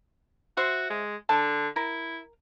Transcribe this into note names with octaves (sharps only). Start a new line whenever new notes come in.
F#4 C5 E5
G#3
D3 A5
E4 A#4